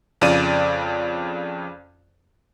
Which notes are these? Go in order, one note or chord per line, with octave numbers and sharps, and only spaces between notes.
F2 C#3 F4 D5 D#7